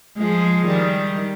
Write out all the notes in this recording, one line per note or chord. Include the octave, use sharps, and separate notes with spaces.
F3 G#3
D#3 G3